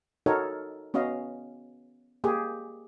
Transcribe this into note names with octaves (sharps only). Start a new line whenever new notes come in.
D#4 F#4 A4 A#4 C#5
B3 C#4 F#4 D#5 F5
A#3 G4 G#4